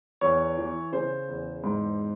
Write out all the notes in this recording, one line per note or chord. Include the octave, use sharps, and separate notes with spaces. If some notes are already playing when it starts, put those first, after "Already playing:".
E2 C#5
E3
C#3 C5
E2
G#2